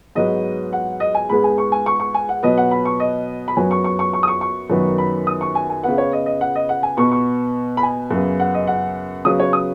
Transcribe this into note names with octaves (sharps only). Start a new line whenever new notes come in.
G#2 F#3 B3 D#5
F#5
D#5
G#5
G#2 G#3 B3 B5
G#5
C#6
G#5
C#6
C#6
G#5
F#5
B2 F#3 B3 D#5
F#5
B5
C#6
D#5
B5
F#2 F#3 B3 G#5
C#6
C#6
C#6
C#6
D#6
C#6
C#6
F#2 D#3 F#3 B3
B5
D#6
C#6
G#5
G#5
C#3 B3 F#5
C#5
D#5
D#5
F#5
D#5
F#5
G#5
B2 B3 C#6
C#6
B5
G#5
F#2 C#3 B3
F#5
D#5
F#5
C#3 F#3 B3 D#6
C#5
D#6